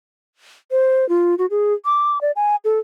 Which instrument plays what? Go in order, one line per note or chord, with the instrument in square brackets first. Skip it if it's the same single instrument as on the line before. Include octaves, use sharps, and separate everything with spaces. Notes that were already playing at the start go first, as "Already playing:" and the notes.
[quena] C5
F4
F#4
G#4
D6
D5
G#5
A4